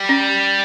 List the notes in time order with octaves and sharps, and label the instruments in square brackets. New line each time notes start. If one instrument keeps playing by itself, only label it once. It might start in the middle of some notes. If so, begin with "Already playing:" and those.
Already playing: [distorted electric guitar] G3
[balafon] C#4